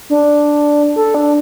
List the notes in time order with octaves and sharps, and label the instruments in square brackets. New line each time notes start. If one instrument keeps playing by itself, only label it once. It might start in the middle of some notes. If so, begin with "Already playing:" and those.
[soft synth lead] D4
A4
D4